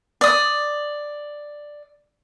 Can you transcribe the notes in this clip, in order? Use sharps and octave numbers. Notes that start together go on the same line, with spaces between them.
D5 D#6